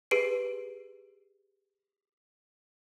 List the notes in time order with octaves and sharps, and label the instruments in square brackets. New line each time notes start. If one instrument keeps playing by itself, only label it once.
[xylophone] G4 G#4 B4 C7 D7